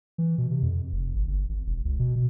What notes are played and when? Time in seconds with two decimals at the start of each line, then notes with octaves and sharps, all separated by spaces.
0.18 E3
0.38 B2
0.50 C3
0.63 F2
0.93 F1
1.15 G#1
1.27 G1
1.49 G#1
1.66 E1
1.85 C#2
1.99 B2
2.16 B2